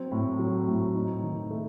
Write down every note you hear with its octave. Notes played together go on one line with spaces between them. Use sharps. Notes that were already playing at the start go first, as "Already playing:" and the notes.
Already playing: F#3 C4
A2
F#3
A2
D#4
D#3
A3